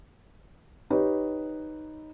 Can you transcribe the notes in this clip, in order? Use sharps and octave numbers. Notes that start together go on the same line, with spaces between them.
D#4 G4 B4 C#5